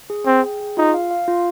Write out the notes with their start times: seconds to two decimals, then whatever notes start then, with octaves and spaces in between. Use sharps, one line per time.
0.10 G#4
0.26 C4 G#4
0.44 G5
0.60 G#4
0.77 D#4 F4
0.94 F5
1.11 F5
1.28 F4